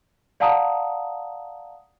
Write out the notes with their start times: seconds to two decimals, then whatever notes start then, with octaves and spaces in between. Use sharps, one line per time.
0.40 D5 F5 F#5 A5 A#5 D#6